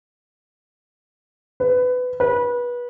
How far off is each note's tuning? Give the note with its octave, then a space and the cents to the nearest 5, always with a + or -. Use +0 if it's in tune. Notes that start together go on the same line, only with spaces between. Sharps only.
B4 +20
B4 -25